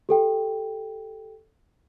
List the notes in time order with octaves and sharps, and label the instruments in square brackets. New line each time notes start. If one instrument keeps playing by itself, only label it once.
[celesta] G4 A4 G5